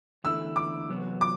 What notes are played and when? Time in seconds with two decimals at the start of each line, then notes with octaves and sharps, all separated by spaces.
0.24 E2 D3 A3 E4 E6
0.56 D6
0.89 E2 C3 F#3 B3 F#4
1.21 D6